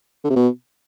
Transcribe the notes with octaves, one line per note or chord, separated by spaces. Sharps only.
D3
C3
B2